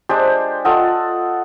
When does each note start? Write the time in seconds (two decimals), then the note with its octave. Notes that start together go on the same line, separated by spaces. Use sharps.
0.09 G#3 D4 G4 C5
0.65 F4 A4 D#5 F#5